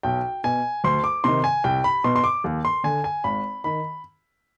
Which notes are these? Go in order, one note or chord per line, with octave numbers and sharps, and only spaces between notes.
B1 G5
B2 G#5
D2 C6
D6
C3 D#3 C6
G#5
C2 G5
B5
B2 C6
C6
D6
D#2
C6
D3 G#5
G#5
G#1 B5
D#3 B5